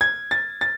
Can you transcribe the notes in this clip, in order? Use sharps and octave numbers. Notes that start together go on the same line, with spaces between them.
G#6
A6
A6